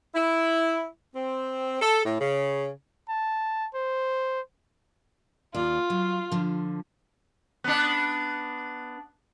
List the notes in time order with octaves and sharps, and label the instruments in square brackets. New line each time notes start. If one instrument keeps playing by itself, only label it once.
[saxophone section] E4
C4
A4
A2
C#3
[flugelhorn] A5
C5
[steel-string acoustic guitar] D#2 D5 [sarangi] F4
[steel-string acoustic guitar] F#3
D3 F3
[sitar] B3 D4